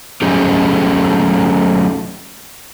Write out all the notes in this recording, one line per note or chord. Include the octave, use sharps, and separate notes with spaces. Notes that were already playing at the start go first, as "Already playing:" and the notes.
F#3 A3 C#4 D#4 G4 G#4